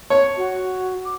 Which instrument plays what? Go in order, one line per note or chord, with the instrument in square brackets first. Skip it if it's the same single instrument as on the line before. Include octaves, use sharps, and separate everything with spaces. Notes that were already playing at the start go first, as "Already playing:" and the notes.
[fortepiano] C#5
[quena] F#4
D6